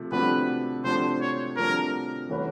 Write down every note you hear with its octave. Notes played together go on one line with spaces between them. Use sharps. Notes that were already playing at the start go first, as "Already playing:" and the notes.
Already playing: C3 F3 A3
C3 F3 A3 D4 F#4 B4
C3 F3 A3 D4 F#4 C5
C#5
C3 F3 A3 D4 F#4 A#4
E3 A3 C#4 F#4 B4